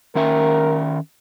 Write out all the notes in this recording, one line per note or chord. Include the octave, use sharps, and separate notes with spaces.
D#3 C#4 A#4 E5